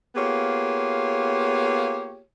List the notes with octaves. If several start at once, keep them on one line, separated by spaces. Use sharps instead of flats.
A#3 B3 F4 G4 G#4 C#5